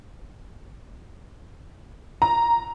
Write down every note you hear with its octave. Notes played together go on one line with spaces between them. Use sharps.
A#5